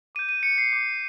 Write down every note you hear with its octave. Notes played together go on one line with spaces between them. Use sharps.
D6 G6 D#7
D#7
C#7
C7
D6 G6